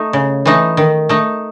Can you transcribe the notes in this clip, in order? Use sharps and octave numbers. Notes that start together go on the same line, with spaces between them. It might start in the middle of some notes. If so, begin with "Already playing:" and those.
Already playing: A3 D#4
C#3
E3 A3 D#4
D#3
A3 D#4